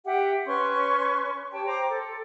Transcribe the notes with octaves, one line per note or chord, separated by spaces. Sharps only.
G4 E5 F#5 G5
C#4 B4 C6 C#6
G4 C#5 G5 A5
C5 G5 A#5 D6
A4